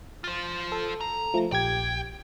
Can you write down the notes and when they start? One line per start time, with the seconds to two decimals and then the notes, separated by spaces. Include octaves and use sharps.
0.24 F4 C5 A6
0.72 A4
1.01 A#5
1.34 F3 A3
1.52 A#1 G4 G5 G#6